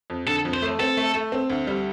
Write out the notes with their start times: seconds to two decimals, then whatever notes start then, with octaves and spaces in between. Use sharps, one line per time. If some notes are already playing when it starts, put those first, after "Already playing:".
0.10 F2
0.27 D3 A4
0.45 F2
0.54 C5
0.62 A3
0.80 C4 A4
0.97 A3
1.15 A3
1.32 C4
1.50 D2
1.67 G3